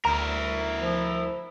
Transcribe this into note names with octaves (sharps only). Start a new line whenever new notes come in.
D2 E4 A#4 A#5
F3